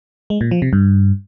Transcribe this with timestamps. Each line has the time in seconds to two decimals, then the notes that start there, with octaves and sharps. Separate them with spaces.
0.30 G#3
0.41 A#2
0.51 F3
0.62 C3
0.73 G2